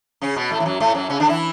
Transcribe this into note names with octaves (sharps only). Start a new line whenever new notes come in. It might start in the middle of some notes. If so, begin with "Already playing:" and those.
C#3 C#4
B2 B3
A2 A3
E3
F#2 F#3
A2 A3
F#2 F#3
C#3 C#4
D3 D4
E3 E4